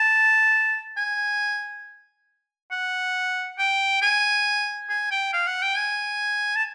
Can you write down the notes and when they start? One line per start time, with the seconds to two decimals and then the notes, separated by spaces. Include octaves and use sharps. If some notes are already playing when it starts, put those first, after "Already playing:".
Already playing: A5
0.97 G#5
2.71 F#5
3.58 G5
4.02 G#5
4.89 G#5
5.11 G5
5.33 F5
5.47 F#5
5.62 G5
5.77 G#5
6.55 A5